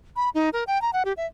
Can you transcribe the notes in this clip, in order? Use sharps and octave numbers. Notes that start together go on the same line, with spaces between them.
B5
D#4
A#4
G5
A#5
F#5
G4
E5